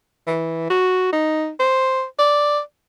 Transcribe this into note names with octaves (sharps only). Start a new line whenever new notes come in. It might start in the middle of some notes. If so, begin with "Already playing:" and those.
E3
F#4
D#4
C5
D5